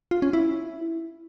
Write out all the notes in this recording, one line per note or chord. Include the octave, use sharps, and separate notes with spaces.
F4
C#4
E4